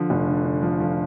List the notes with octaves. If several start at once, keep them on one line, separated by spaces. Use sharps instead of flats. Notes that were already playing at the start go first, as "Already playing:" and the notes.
Already playing: D3 F3
F1
D3
D3
F3
F3